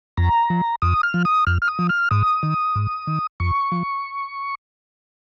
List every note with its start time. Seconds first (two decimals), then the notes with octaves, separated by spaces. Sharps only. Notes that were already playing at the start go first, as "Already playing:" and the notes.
0.17 F2 A#5
0.50 F3
0.82 F2 D#6
1.03 F6
1.14 F3
1.25 D#6
1.47 F2 F6
1.62 F6
1.68 D#6
1.79 F3
1.89 F6
2.11 G#2 D#6
2.43 D#3
2.76 G#2
3.07 D#3
3.40 F2 C#6
3.72 F3